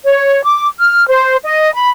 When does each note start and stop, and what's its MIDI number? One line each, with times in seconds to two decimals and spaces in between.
0.05 0.41 73
0.44 0.68 86
0.79 1.07 89
1.08 1.37 72
1.44 1.72 75
1.74 1.89 83